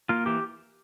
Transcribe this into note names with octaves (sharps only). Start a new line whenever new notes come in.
A#3 F4
E3 G4